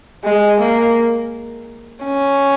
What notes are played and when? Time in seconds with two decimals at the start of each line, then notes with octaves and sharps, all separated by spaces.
0.24 G#3
0.61 A#3
2.05 C#4